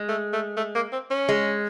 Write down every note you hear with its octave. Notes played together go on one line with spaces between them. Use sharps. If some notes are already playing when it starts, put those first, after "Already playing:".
Already playing: G#3
A3
A3
A3
A#3
C4
C#4
G#3